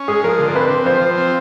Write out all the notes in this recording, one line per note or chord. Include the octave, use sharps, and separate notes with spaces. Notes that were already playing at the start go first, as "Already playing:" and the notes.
Already playing: C#4
G#3 G#4
F3 A#4
D3
A#4
C4 B4
C4
F3 C5
F3
C4